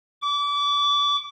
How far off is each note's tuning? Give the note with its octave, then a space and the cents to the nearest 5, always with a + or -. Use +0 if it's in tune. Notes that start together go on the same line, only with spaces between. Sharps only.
D6 -30